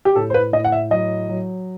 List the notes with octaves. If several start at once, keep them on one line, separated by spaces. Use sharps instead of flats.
G4
A2 A4
C5
B4
A2 D#5
F#5
E5
F#3 D#5
F#3